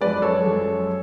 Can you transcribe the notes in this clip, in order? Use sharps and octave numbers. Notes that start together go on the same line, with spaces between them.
F#2 F3 G#3 B4 D5
A4 C#5
F#2 F3 G#3